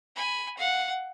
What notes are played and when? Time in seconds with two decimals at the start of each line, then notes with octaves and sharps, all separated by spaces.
0.16 G#5 B5
0.58 F5 F#5